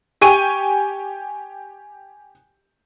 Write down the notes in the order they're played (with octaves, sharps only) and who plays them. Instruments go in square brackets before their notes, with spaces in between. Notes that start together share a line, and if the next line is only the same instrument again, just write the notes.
[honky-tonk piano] G4 G5 G#5 C#6 D#7